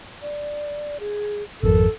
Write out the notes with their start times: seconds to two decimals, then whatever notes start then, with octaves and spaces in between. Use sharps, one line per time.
0.22 D5
1.00 G#4
1.63 G#1 F2 A4 A#4